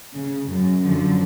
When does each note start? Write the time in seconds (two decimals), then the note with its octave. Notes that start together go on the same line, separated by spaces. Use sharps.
0.14 C#3
0.48 F#2
0.84 F#2 D3 F3 F#3